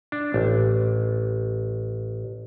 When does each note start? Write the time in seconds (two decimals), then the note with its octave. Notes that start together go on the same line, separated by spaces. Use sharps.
0.12 D4
0.34 A1